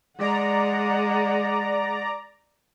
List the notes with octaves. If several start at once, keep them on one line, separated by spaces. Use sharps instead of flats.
G#3 D5 F#5 A#5